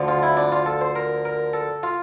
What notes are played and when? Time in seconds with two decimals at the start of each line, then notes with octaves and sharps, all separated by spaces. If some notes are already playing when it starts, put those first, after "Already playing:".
Already playing: D2 D3 F3
0.08 F4
0.23 E4
0.37 D4
0.52 F4
0.66 A4
0.81 C5
0.96 A#4
1.25 A#4
1.53 A4
1.83 F4